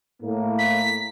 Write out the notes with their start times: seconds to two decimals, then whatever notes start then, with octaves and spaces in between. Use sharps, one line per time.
0.22 A2 A#3
0.58 B6